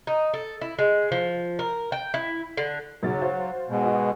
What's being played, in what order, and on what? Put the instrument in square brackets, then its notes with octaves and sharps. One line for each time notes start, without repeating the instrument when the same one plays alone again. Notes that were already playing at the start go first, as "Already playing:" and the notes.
[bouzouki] D#4
A4
E4
G#3
F3
A#4
G5
E4
D3
[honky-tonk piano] B1 C#3 A6 [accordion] F#3
[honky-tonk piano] F#4 C5 F5
[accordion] G#2 B2
[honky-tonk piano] F#4 G#4